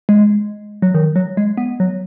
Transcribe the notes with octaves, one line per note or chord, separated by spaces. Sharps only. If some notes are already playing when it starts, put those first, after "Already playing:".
G#3
F#3
D#3
F#3
G#3
B3
F#3